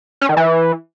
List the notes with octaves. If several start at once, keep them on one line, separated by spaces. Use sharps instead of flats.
C#4
D#3
E3